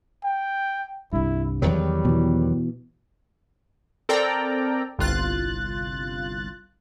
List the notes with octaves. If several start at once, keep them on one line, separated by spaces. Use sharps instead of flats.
G5
C2 G2 E4
E2 D#3 F#3 G3
B2 E3
C4 A4 A#4 D5 G5 A#5
G1 C2 F4 F#6 A6